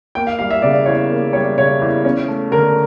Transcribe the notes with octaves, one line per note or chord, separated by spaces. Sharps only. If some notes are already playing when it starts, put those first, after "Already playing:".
A#3 G5
F5
G3 F5
E5
C#3 D5
E2 C#5
A#3
G3 C#5
C#3 C#5
E2
C#4
A3
D3 A#4